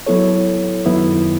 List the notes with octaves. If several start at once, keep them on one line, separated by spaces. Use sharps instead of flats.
F#3 B3 E4 A4 C#5
F#2 D#3 F#3 B3 E4